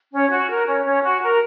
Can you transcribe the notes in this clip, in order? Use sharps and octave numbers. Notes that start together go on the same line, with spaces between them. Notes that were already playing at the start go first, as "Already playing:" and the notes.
C#4
F#4
A#4
C#4
C#4
F#4
A#4